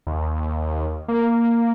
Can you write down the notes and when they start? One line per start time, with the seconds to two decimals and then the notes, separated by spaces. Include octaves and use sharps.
0.07 D#2
1.08 A#3